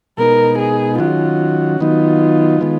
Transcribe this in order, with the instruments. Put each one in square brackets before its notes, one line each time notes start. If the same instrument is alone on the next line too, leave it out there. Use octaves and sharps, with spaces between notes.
[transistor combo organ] B2 G#3 B3 D#4 [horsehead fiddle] A#4
[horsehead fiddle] G#4
[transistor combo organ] D#3 F#3 C#4 F#4 [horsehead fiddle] F4
[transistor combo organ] D#3 F#3 B3 D#4 [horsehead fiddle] F4
[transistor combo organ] D#3 G#3 B3